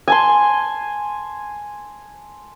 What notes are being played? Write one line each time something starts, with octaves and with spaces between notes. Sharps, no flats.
G#5 A5 C6